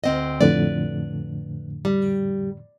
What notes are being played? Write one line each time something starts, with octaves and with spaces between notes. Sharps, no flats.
D2 C4 D#5
F2 A2 D3 B4 D5
G3